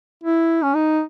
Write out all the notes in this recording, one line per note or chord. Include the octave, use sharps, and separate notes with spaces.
E4
C#4
D#4